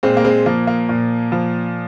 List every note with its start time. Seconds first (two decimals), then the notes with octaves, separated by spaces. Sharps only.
0.03 A#2 G#3 C4
0.17 A#3
0.25 G#3 C4
0.46 F3 A#3
0.67 A#3
0.89 A#2
1.32 F3